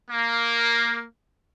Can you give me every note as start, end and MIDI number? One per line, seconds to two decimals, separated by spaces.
0.11 1.05 58